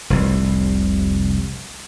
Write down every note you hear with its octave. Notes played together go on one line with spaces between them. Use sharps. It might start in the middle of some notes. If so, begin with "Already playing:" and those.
F1 C2